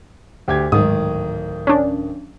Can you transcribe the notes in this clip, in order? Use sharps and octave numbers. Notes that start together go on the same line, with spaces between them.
D2 G4 G#6
D1 G#2 D#3 D#6
C#4 D4